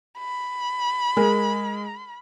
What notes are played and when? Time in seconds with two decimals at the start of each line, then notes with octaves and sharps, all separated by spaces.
0.19 B5
1.17 G#3 G#4 A#4